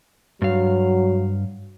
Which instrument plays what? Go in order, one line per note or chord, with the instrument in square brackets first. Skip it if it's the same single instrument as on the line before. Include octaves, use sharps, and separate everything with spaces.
[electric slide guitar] G2 F5 [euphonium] F#3